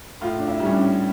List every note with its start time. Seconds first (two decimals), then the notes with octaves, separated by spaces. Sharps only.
0.21 A2 F4
0.39 D4
0.48 E4
0.60 G3 C#4
0.72 D4